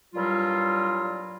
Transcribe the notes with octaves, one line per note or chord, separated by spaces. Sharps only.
G2 A#2 F#3 G3 E4 F4